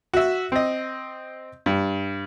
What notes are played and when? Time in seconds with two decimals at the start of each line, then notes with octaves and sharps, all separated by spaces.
0.14 F#4 E5
0.52 C4 D#5
1.66 G2